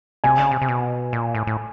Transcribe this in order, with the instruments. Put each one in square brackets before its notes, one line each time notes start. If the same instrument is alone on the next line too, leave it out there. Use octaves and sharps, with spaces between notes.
[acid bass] C3 [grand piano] G#5
[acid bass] C#3
C3
C3
B2
A#2
A2
A2